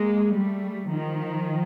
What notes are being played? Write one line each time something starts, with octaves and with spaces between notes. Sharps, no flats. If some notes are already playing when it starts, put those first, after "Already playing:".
Already playing: G#3 A#3
G3 A3
D#3 F3